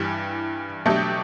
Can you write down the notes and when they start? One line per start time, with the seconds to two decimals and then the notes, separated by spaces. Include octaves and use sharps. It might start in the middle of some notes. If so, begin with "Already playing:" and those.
Already playing: G2 E3 G3
0.86 B2 F#3 A3 D4 G4